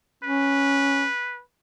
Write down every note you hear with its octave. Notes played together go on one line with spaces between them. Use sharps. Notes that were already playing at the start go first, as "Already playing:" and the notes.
C#4 B4